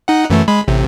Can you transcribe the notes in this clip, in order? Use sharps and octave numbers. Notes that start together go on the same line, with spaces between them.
D#4 F#5
F#2 E3 A3
G#3 B5
A1 C3